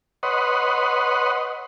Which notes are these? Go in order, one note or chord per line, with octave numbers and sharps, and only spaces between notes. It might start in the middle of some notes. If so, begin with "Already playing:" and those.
B4 C#5 D#5 F#5 C6